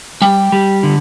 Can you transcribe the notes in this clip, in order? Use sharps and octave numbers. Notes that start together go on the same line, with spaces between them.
G3 G5
G3
D3